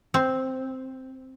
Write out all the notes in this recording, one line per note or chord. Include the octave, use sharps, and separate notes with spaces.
C4